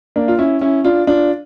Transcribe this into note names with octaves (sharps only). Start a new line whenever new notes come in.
A#3 D4
F4
C#4 E4
C#4 E4
D4 F4
D4 F4